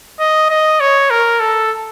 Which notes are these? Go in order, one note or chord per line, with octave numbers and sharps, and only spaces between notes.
D#5
D#5
C#5
A#4
A4